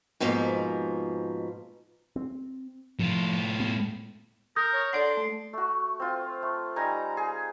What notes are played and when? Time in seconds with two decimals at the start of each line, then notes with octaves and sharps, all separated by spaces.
0.20 G#2 B2 F3 A#3
2.16 C4
2.99 A2 F3 F4
3.60 B3
4.56 A#4 D#6 G6 A#6
4.73 C#5
4.93 D4 A4 D5 F#5 C6
5.17 A3
5.53 A3 F#4
6.00 C4 F4
6.42 A3
6.76 G3 D#4 G#5 A#5
7.17 G#4